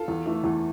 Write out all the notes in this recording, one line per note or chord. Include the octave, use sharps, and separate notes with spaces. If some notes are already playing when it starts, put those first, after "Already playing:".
Already playing: F4 A4
E2
E3 A3
E2